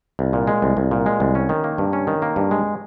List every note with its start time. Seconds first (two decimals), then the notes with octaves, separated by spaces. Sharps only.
0.19 C2
0.33 A#2
0.47 G#3
0.62 C2
0.77 C2
0.91 A#2
1.06 G#3
1.20 C2
1.35 C#4
1.49 D#3
1.64 A#3
1.78 G2
1.93 C#4
2.07 D#3
2.22 A#3
2.36 G2
2.51 G#3